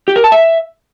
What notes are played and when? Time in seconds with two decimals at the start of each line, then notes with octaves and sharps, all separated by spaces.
0.08 G4
0.16 A#4
0.24 A5
0.32 E5